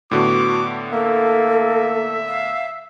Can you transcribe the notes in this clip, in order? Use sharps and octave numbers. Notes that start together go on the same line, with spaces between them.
A2 D3 B3 F#4 D6
A#3 A4 E5
F5